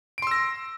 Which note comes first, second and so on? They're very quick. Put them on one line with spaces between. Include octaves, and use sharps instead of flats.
D7 C6 E6 A#6